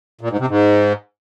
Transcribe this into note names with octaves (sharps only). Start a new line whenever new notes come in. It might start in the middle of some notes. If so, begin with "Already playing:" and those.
A#2
G#2
C3
G#2